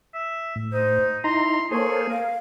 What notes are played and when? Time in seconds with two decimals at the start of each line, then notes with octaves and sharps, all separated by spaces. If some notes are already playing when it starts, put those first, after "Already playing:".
0.14 E5
0.56 A2
0.73 D#4 C5
1.24 D#4 E4 A#5 C6
1.71 A#3 G#4 A4 C5 C#5
2.10 A#4 F5